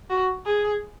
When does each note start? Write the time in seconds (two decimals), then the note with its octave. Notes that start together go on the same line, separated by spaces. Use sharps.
0.10 F#4
0.46 G#4